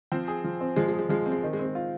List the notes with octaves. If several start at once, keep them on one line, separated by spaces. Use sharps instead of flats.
F3 C4
G#4
F3
C4
F3 G#3
G#3
G#4
G#3
F3 G#3
C4
G#3
D#3
G#3
C4
G#3
F4